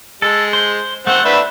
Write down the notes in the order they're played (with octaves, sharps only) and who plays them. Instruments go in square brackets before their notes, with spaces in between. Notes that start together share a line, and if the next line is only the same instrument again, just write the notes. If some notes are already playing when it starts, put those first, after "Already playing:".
[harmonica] G#3 [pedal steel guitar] A4
[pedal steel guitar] C5
[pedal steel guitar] A3 C5 [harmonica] C4 F#5
[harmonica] D4 B4 E5